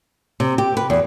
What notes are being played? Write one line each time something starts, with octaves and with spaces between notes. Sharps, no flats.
C3
G4
B4
E2